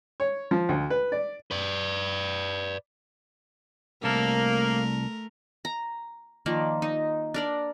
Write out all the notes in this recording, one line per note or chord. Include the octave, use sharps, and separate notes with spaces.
C#5
F3
D2
B4
D5
B4 D5
C2 A3 A#3 A4 A#4
A#5
D#3 F3 A#3 D5
D#4
D4 A#4 D5